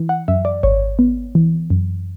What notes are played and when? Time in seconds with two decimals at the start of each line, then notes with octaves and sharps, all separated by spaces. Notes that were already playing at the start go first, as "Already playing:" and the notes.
Already playing: E3
0.09 F#5
0.28 F#2 E5
0.45 D5
0.63 G#1 C#5
0.99 B3
1.35 E3
1.70 F#2